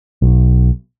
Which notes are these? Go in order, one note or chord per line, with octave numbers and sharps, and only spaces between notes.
B1